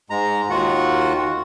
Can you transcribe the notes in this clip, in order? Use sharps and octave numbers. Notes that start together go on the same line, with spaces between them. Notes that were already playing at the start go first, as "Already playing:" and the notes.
G#2 G#3 A#5
D#2 D#3 F4 F#4 F#5